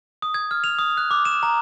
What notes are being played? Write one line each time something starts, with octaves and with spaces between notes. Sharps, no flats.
D#6
G#6
F6
F7
D#6
F#6
D6
E7
A#5